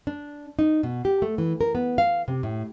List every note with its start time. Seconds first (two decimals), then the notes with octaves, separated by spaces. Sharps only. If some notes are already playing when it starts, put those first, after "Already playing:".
0.07 D4
0.59 D#4
0.83 B2
1.05 G4
1.22 A3
1.38 E3
1.61 A#4
1.75 B3
1.98 F5
2.28 C3
2.43 A2